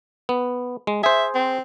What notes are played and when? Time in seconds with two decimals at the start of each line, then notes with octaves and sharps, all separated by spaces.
0.29 B3
0.87 G#3
1.03 G#4 C5 E5
1.35 C4